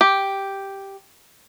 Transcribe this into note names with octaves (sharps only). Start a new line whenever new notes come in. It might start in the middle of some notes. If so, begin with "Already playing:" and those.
G4